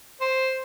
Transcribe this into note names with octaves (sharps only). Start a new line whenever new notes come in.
C5